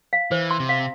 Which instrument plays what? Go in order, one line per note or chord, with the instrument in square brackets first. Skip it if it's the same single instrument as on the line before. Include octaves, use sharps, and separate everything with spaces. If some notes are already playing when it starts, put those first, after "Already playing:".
[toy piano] F5
[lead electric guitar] E3 [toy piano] C5
[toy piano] C6
[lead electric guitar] C3
[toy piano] F5